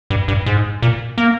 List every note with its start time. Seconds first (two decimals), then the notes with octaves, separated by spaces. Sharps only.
0.10 G2
0.28 G2
0.46 G#2
0.82 A#2
1.18 A#3